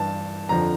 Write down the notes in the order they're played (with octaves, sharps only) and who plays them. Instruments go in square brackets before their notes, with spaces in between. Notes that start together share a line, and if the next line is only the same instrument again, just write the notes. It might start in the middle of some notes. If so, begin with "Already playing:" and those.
Already playing: [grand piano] G2 E3 A5
F2 D3 F3 A#5